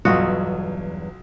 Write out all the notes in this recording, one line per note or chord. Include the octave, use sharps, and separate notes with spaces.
B1 E2 G2 F#3 F4 F#4 D#6